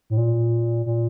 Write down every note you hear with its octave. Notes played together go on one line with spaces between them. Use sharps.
A2
A#2
A#2